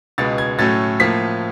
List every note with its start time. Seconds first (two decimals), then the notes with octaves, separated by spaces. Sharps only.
0.18 C#2 B2 G#3 B3 A6
0.38 G#6
0.59 A2 F#3 A3 C#4 A6
1.00 A2 F3 A#3 B6